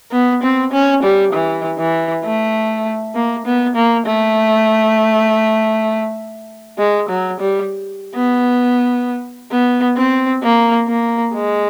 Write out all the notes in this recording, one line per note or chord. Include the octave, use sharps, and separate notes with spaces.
B3
C4
C#4
G3
E3
E3
A3
A#3
B3
A#3
A3
G#3
F#3
G3
B3
B3
C4
A#3
A#3
G#3